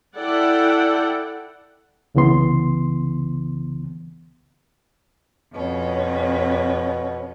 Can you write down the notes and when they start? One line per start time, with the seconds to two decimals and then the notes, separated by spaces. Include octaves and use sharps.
0.16 E4 A4 D5 F#5 G5
2.15 C2 C#3 E3 B3 C6
5.55 F2 B2 C#4